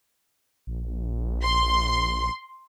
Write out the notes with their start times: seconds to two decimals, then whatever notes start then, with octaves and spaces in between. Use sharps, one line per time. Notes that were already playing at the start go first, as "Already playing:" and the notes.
0.67 A#1
1.43 C6